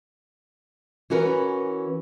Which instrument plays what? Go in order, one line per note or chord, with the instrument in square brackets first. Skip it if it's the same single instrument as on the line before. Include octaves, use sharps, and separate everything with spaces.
[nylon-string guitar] E3 C#4 F#4 A#4 B4